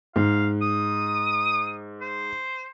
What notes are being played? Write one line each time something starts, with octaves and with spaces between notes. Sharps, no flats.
G#2 F5
D#6
C5